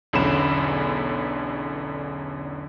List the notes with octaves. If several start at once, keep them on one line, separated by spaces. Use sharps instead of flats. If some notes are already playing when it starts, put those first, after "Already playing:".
B1 E2 D3 C#4 B5 E7